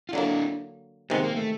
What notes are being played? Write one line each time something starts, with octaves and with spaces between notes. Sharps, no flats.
F4
D3 F#3 A#3 D4 E4
C3 D#3 G#3 B3 C4
A#3
A3